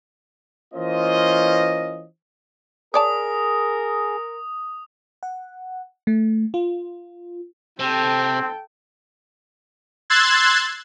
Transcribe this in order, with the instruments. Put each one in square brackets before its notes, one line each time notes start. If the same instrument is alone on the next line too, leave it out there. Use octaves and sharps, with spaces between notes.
[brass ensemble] E3 A#3 C#4 F4 C5 D#5
[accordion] G#4 [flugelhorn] A#4 [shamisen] C#5 D5 A5 [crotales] D#6
[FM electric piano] F#5
A3
F4
[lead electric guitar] C3 [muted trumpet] C4 [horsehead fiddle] A4 G5
[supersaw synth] C6 E6 F#6 G#6 A6